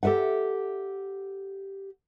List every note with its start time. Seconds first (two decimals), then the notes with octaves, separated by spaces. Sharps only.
0.03 G4 A4 B4 E5 F#5